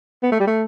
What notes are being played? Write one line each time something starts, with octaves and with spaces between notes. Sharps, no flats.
B3
A3
G3
A3